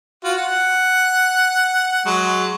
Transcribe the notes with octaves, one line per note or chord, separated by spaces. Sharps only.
F4 F#4
F#5
F#3 G#3